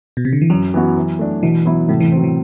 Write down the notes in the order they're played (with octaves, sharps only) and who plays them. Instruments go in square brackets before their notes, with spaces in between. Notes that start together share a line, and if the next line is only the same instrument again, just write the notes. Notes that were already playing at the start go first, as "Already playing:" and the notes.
[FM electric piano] B2
C3
D3
E3
[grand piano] F#2 [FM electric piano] F#3
[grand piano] E3 B3 F#4
E3
A3 D4
[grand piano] B2 [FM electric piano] E3
[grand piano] F#3 B3 E4
[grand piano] A2 [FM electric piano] C3
[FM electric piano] E3
[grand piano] F#3 C4
[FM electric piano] E3